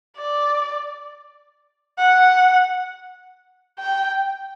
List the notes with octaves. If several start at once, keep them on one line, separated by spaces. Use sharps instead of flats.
D5
F#5
G5